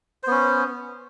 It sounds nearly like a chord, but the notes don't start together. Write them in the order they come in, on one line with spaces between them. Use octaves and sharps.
C5 B3 C#4